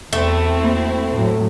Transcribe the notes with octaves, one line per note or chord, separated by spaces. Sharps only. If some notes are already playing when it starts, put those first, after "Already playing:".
E2 A3 C4 E4 F#4
A#3
A2 F#3